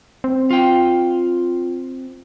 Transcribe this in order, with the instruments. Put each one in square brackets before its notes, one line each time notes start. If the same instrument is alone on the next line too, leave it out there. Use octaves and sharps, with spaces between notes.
[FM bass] C4
[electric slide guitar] F4 G5